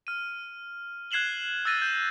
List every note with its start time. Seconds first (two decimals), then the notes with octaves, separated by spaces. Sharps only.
0.07 F6 D#7
1.11 F#6 G#6 C7 E7 F#7 G7
1.65 E6 F#6 A6 A#6 D#7
1.82 G6